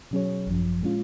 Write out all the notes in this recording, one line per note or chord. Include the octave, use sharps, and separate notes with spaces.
B2 F#3 C#4 G#4 C#5
G#1 F#2 F3
A#2 G#3 C#4 F4